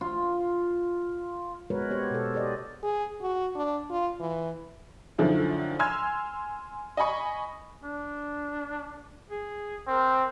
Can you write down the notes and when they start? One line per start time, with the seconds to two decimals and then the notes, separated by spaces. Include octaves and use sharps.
0.01 F4
1.70 G#3 B3 F#4 A#4 B4 C#5
1.90 B3 G4 C5 C#5
2.11 B2 A4
2.34 G4 C5 D5 D#5
2.83 G#4
3.21 F#4
3.55 D4
3.90 F4
4.20 E3
5.18 F#2 D3 D#3 F3 E4
5.79 G#5 C6 E6 F6 G#6
6.97 D#5 G#5 B5 C#6
7.83 D4
9.30 G#4
9.88 C4 A#4